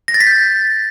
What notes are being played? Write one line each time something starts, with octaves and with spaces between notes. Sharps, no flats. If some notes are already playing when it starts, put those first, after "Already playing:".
A#6
A6
B6
G6